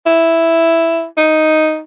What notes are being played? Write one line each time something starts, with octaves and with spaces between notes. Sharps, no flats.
E4
D#4